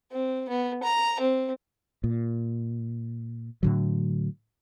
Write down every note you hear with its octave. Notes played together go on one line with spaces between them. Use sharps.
C4
B3
A#5
C4
A#2
A2 D3 F#3